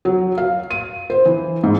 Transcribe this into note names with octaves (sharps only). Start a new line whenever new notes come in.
F#3
F5
D#7
C5
E3
G#2